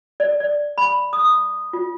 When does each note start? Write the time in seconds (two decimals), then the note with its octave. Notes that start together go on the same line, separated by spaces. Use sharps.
0.20 D5
0.40 D5
0.78 B5
1.13 D#6
1.73 F4